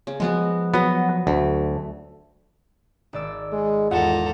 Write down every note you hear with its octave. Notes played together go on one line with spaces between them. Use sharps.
C#3
F3 G#3 B3 F#4
F#3 B3 D#5
D2 A3
G#1 D5 E6
G#3
E2 G#2 F4 A4 F#5 A#5